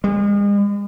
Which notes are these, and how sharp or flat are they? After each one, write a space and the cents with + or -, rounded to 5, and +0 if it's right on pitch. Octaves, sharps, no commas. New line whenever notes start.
G#3 -40